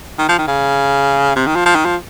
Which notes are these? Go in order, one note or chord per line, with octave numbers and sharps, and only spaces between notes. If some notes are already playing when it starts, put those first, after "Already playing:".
D#3
F3
D#3
C#3
C3
D#3
F3
F3
D#3
F3